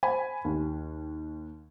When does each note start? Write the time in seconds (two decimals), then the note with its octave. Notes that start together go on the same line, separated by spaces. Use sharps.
0.03 C5 G#5 B5
0.45 D#2